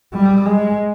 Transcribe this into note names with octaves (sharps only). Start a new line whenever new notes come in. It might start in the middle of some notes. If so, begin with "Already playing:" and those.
G3
G#3